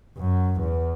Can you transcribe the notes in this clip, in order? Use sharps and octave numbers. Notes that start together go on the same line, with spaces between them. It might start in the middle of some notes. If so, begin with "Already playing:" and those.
F#2
E2